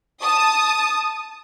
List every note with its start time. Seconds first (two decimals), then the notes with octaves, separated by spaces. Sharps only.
0.21 A5 D#6